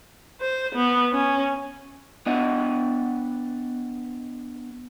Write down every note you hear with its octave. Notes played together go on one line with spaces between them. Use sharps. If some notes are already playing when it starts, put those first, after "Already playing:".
C5
B3
C#4
B3 D4 D#5 F#5